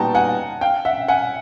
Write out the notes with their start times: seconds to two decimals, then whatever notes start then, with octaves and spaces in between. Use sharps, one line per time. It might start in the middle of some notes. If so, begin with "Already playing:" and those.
Already playing: A#2 G3 B3 D#4 F#4 G5 A5 A#5
0.15 F#5 G#5
0.61 F5 G5
0.85 E5 F#5
1.08 F#5 G#5